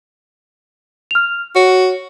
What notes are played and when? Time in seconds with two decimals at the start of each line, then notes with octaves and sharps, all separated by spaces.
1.11 F6 F7
1.56 F#4 C#5